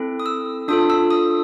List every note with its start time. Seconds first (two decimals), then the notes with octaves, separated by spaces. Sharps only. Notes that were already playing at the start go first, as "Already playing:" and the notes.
Already playing: C4 E4 A4
0.20 D#6
0.26 E6
0.68 D4 F4 A4 D#6
0.90 E6
1.11 D#6